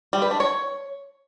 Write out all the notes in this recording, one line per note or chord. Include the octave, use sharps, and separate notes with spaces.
G3
B4
D4
C#5